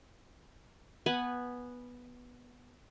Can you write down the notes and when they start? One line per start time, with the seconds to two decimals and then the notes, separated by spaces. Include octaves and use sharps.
1.06 B3 B4 F#5 G#5